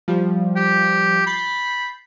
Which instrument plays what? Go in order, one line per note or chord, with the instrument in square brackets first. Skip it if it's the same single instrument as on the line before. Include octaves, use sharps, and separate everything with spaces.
[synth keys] F3 G3
[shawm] G4
[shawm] B5 [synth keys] G6 A6 C7